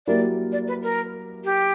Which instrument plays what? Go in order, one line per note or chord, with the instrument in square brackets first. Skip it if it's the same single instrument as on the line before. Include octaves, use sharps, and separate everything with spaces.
[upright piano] F#3 A#3 E4 G4 A#4 [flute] D5
[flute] D5
B4
A#4
G4